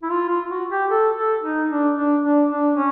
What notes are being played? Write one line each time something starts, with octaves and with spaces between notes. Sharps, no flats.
E4
F4
F4
F#4
G4
A4
A4
D#4
D4
D4
D4
D4
C#4